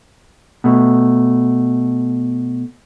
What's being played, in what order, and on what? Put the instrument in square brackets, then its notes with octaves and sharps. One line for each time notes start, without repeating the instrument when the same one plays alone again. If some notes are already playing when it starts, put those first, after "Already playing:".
[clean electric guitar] B2 A3